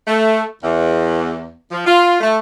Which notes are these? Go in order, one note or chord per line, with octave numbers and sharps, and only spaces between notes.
A3
E2
F3
F4
A3